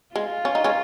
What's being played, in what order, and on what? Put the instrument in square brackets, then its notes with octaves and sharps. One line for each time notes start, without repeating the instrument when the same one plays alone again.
[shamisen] G#3 [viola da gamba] F4
[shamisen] C#4
D#4
G#3 C#4